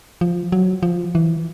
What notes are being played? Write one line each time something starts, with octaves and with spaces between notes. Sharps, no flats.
F3
F#3
F3
E3